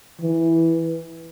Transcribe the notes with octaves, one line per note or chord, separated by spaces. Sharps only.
E3